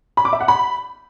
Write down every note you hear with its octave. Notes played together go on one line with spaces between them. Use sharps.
B5
D6
E5
F#5
B5